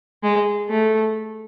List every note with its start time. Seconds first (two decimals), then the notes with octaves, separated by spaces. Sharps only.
0.23 G#3
0.69 A3